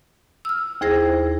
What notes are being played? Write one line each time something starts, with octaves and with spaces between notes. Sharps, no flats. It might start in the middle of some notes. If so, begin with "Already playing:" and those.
E6 F6
D#2 E4 G#4 C5 A#6